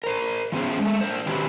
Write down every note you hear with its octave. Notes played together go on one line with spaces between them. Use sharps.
A#4 C5
F3 B3 C#4 G#4 C5
G#3 A3
D4 C5
D#3 F#3 G4 B4 C5